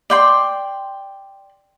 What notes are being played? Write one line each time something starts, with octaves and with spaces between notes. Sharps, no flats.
D5 G5 C6